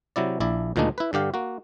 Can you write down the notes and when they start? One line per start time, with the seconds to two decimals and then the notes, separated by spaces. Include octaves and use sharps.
0.16 C3 F#3 E4 D5
0.40 A#1 E4 D5
0.76 D2 A#2 D#3 G#3 D4 D#4
0.98 E4 B4
1.13 G2 D3 G4 F5
1.34 A#3 F#4